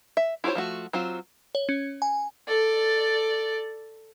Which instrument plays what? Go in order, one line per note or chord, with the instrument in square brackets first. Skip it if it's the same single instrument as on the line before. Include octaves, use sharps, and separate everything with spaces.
[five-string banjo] E5
E4 F4 G4 C5 C#5
F3 A3 F#4
F#3 C4 F4
[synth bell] C#5
C#4
G#5
[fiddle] A4 D5